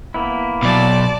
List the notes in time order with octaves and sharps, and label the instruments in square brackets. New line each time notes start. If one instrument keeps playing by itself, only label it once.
[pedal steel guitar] A#3 B3 E4
[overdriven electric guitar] B2 F#3 [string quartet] D5 A5